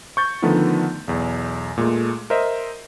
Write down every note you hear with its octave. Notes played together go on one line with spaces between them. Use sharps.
C#6 G6 A6
D3 D#3 F3 A3 B3 D#4
B1 E2
A#2 G#3 A3
A#4 C5 D#5 E5